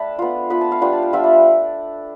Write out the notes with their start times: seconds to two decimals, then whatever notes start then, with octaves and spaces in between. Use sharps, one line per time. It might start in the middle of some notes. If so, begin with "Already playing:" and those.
Already playing: A3 D4 G5 A5 B5
0.19 B3 F4
0.50 B3 F4 B5
0.61 A5
0.72 F5
0.81 G3 B3 D4 F4 G5
0.93 A5
1.03 G5
1.13 G3 B3 D4 F4 E5
1.24 D5